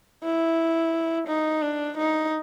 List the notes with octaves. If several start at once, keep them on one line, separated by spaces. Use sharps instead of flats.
E4
D#4
D4
D#4